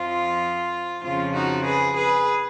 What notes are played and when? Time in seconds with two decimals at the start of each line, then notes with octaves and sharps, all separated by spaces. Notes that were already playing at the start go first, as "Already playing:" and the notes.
Already playing: F2 F3 F4
1.03 F2 C#3 F3 F4
1.33 D#4 F#4
1.64 G#4 B4
1.95 G#4 B4